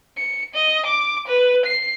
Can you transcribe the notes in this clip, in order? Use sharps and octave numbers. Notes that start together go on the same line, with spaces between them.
C#7
D#5
D6
B4
C7